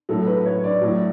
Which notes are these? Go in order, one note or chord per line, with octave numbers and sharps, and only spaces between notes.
A2 F#3 A3 A4
B4
C#5
D5
A2 F#3 A3